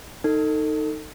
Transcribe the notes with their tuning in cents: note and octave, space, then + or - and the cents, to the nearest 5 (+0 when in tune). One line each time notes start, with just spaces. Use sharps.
D#4 +0 A4 +30